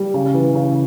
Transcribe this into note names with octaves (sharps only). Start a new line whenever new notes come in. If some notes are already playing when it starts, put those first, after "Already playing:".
Already playing: G3
C#3
E3
C#3